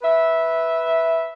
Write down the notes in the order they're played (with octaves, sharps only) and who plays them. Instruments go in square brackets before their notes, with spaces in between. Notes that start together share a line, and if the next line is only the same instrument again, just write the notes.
[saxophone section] B4 E5